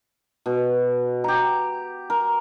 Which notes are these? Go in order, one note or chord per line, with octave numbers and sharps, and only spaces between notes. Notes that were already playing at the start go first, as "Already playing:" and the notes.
B2
G4 A#5
A#4